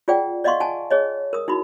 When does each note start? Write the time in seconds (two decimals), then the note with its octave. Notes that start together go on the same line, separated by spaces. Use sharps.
0.08 F4 G#4 D5 F#5 G5
0.44 D5 D#5 F5 F#5 C6 C#6
0.60 F#5 G#5 A5
0.90 G#4 C#5 D#5
1.33 A#4 D#6
1.48 D#4 E4 F#4 B5